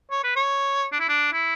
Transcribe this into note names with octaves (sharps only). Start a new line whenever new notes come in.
C#5
B4
C#5
D4
E4
D4
E4